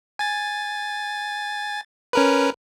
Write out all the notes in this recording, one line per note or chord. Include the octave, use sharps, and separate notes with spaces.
G#5 A6
C#4 A#4 B4